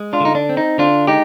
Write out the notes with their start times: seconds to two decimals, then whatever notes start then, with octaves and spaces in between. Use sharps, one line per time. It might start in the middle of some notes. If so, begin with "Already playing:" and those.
Already playing: G#3
0.13 D4 F4
0.20 D3 D#4
0.35 D4
0.49 C4
0.57 D#4
0.78 D3 D4 F4
1.07 G#3 D#4 G4